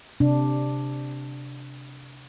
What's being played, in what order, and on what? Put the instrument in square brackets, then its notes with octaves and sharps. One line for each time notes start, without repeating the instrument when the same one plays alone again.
[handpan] C3 D4